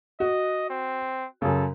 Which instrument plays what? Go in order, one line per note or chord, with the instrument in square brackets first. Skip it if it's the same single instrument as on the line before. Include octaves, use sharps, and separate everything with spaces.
[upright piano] F#4 [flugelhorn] D#5
[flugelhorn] C4
[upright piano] F#2 C#3 [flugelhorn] A4